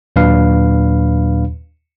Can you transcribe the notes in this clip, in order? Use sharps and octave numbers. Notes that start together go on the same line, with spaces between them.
D#2 A#2 F#3 D4 B4 F5